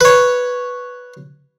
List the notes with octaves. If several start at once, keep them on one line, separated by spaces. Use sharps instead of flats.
B4 C#5